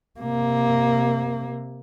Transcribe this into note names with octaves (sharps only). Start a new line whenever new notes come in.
C3 A#3